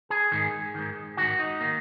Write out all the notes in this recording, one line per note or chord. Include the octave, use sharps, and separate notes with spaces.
G#4
G#2 D#3 G#4
G#2 D#3
G#2 D#3 F#4
D#4
D#3 A#3